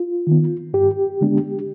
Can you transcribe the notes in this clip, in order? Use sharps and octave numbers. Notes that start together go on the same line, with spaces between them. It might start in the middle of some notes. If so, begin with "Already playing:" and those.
Already playing: F4
D#3 B3
G2 G4
D3 G#3 B3 D4